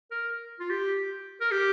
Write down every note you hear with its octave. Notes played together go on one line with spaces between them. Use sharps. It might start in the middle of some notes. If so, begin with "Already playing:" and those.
A#4
F4
G4
A#4
G4